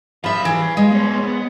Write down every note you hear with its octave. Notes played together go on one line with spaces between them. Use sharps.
F3 E5 F5 B5
E3
G#3
B3 C#5
B3